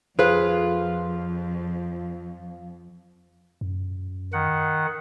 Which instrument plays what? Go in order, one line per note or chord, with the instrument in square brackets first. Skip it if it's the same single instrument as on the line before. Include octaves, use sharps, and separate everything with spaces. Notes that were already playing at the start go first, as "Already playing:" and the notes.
[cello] F2 [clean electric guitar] F4 [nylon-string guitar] G#4 B4 F5 [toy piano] A4 C5
[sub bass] F#2
[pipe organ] D#3 F#5